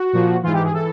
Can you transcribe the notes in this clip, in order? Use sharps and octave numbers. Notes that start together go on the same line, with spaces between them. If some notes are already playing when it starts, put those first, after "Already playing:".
Already playing: F#4
A#2 F3
G#2 E3 F4
G4
G#4
E3 A4